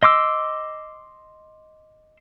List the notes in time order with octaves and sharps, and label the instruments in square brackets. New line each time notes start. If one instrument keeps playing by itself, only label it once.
[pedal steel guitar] D#5 C6 D6 E6